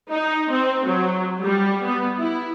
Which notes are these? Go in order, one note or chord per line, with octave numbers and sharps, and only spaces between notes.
D#4
C4
F#3
G3
B3
E4